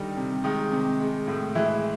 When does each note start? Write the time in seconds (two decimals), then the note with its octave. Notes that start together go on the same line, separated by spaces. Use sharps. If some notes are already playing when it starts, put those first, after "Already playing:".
Already playing: D3 D#3 G3 D#4
0.17 C3
0.44 D#3 G#3 D#4
0.72 C3
1.00 G#3
1.27 A2
1.55 E3 G#3 E4